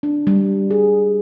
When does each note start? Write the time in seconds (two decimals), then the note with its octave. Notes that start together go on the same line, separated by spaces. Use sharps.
0.03 D4
0.27 G3
0.71 G#4